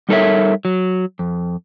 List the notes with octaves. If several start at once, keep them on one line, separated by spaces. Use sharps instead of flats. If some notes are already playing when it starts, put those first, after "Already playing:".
G3 D#4 A4 A#4 C#5 E5
F#3
F2